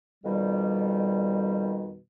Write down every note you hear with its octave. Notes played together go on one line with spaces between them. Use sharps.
F2 B2 D#3 G3